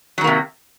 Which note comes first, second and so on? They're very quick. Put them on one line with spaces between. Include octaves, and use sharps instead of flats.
F#3 D#3 A#3 C3